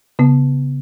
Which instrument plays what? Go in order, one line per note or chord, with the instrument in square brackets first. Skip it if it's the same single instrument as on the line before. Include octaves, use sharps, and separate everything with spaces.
[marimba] C#3 B3